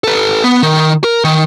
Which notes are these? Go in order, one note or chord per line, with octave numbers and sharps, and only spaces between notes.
A4 B4
B3
D#3
A#4
D#3